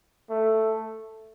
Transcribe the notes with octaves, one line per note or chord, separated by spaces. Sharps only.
A3